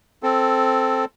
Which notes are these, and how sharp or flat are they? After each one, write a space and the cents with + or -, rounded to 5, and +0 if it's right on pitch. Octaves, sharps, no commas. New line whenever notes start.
C4 +0 A4 +0